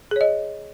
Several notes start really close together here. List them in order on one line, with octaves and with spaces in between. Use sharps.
G#4 C#5 D#5